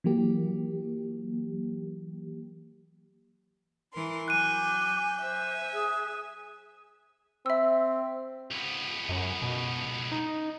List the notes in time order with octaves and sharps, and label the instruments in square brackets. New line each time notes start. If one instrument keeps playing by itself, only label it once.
[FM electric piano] E3 F#3 A#3 G4
[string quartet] E3 A#4 C6
[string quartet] F#3 G#5 G6 [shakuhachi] D6 [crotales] F#6 D#7
[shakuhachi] C5 [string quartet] E5 G#5
[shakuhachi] G#4
[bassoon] C4 [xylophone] E5 E6
[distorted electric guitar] C#2 B3
[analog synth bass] F#2
B2
D#4